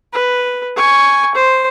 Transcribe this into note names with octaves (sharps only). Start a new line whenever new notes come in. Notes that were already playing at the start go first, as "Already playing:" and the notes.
B4
G#5 C#6
C5